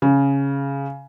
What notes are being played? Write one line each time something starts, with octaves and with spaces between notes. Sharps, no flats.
C#3